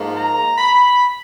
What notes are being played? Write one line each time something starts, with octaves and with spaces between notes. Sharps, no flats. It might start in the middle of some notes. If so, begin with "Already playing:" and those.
Already playing: G#2 F3 A#3
A#5
B5